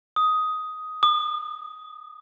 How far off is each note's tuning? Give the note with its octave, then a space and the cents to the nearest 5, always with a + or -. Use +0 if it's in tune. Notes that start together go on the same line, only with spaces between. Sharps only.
D#6 +10
D#6 -40